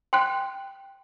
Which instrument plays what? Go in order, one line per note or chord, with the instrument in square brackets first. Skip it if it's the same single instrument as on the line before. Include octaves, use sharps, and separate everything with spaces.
[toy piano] G5 [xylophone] C6 F#6